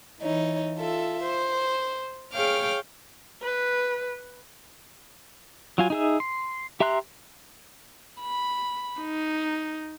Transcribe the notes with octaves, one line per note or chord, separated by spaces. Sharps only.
E3 D#4 C#5
F4 A4 E5
C5
G#4 C#5 F5 G5 D6 F6
B4
F#3 F4 G#5
D#4 G#4 E5
C6
G4 E5 A#5 C6 F#6
B5
D#4